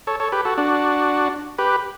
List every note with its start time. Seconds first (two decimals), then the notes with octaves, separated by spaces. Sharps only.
0.07 A4 C#5
0.20 A4 C#5
0.32 G4 B4
0.45 F#4 A4
0.58 D4 F#4
1.58 G4 B4